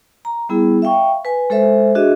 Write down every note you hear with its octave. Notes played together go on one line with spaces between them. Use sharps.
A#5
G3 B3 E4 G#4
E5 F5 G5 C#6
B4 G#5
G#3 A4 C5 E5
D4 F#4 G#4 D#5 E5